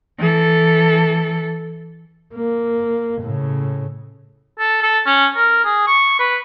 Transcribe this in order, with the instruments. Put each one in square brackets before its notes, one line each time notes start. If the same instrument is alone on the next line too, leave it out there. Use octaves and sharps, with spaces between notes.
[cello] E3 A4
[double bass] A#3
A2 C#3
[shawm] A4
A4
C#4
A#4
G#4
C#6
B4